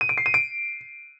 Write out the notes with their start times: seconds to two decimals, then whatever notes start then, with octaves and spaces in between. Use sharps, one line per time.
0.01 D#7
0.09 D7
0.18 C7
0.26 D#7
0.34 D7